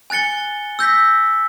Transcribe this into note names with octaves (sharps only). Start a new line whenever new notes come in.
G#5 F#6 A6 C#7 G7
E6 G6 A#6 B6